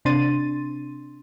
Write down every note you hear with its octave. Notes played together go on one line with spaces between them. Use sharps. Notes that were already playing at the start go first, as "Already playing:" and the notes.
C3 C4 D4 C6 A6 D#7